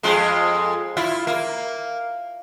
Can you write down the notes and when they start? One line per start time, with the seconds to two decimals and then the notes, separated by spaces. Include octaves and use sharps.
0.03 F2 G#3 F4
0.97 E4 F4
1.27 A#3